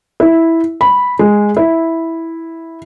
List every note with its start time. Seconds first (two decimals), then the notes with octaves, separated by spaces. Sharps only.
0.20 E4
0.81 B5
1.19 G#3
1.57 E4